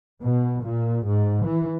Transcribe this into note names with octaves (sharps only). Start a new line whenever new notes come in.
B2
A#2
G#2
E3